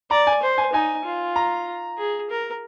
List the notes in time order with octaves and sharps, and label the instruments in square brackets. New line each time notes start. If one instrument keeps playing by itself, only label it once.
[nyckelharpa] D5 [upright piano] A#5
[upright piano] G#5
[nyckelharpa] C5
[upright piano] G#5
[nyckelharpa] D#4 [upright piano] G#5
[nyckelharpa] F4
[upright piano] A#5
[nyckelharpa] G#4
A#4